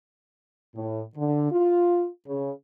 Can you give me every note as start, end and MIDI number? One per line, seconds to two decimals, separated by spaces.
0.75 1.01 45
1.16 1.52 50
1.52 2.07 65
2.27 2.51 49